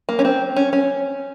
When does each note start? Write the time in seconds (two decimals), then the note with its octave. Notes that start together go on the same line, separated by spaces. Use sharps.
0.09 A#3
0.19 C#4
0.25 C4
0.56 C#4
0.73 C#4